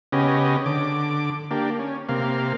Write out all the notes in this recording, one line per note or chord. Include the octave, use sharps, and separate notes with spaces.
C#3 B3 C#4 G4 D#5
D3 D6
A#3 D4 G4
C#4
C3 A#3 F5